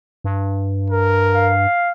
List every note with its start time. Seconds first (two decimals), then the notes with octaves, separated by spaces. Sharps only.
0.24 G2
0.90 A#4
1.35 F5